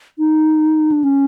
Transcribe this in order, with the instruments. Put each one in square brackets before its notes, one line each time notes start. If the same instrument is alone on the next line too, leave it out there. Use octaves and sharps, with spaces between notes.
[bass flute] D#4
D4
C#4